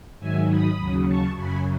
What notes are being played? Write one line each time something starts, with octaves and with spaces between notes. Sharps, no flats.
G#2 D#3 F#3 E5 G#5
B5 D#6
D#2 C#3 F#3
A5 C#6
F#2 C#3 F#3 G#5 B5